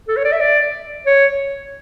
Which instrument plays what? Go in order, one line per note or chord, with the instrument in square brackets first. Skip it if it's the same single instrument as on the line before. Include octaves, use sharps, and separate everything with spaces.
[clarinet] A4
C#5
D5
E5
D5
C#5